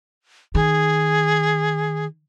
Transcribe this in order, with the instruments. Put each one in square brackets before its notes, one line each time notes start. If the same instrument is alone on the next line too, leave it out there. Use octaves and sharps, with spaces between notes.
[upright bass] D#3 [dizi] G#4